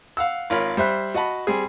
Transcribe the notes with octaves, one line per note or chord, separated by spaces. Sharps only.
F5 F#5 E6
G#1 F4 A#4 C#5 B5
G3 C5 E5 F#6
F#4 D#5 F#5 A5 B5
G3 C4 G#4